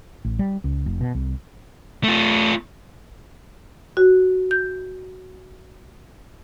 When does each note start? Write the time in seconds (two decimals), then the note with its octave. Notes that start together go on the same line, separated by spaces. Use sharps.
0.25 A1
0.39 G3
0.64 C#2
0.86 F1
1.01 B2
1.15 C2
2.04 A3 F4
3.97 F#4
4.51 G6